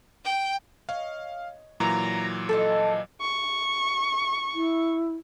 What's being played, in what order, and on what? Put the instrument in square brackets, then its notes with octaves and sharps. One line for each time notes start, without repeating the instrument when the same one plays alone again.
[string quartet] G5
[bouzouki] C#5 D#5 [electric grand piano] F5
[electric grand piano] A#2 E3 F#3 [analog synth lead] A#5
[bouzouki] F3 D#4 D#5 [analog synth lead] A4
[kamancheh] C#6
[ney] E4